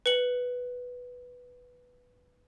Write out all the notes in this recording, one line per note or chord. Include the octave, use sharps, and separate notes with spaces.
B4 C#7 F#7